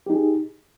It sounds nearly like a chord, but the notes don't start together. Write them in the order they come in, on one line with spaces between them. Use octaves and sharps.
G4 D#4 G#4